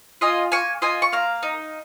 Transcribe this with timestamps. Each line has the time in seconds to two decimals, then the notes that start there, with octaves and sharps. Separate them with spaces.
0.21 F4 D#5 G#5
0.52 A#3 G#5 C#6
0.82 F4 D#5 G#5
1.02 C#6
1.12 A#3 F5 A#5
1.43 D#4